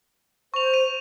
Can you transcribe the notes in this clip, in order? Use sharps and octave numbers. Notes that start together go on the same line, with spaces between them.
C5 C#6 F7
D#7